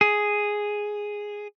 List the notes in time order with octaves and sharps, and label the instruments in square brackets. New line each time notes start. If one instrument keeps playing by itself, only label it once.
[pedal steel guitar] G#4